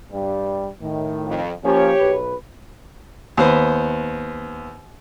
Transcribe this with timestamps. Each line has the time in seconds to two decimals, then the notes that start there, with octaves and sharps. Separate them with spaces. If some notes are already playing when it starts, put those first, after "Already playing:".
0.12 G2 G3
0.82 A2 D#3
1.27 F2
1.65 F3 A#3 C#4 G4 C#5
2.01 B1 B4
3.37 D#2 B3 C5